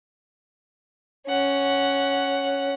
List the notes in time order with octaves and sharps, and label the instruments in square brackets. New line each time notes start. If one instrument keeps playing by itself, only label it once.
[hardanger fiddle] C#4 F#5